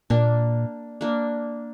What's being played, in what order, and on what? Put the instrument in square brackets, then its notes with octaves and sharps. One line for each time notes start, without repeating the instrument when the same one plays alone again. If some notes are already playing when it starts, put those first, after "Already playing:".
[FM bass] A#2 [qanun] A#3 D4
[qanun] A#3 D4